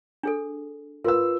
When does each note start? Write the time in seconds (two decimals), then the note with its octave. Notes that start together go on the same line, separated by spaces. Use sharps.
0.23 D4 G#4 A4
1.04 F4 A#4 B4 E6